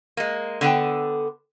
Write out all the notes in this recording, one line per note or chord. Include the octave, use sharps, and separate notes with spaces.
G#3 A#3
D3 B3 A4 G5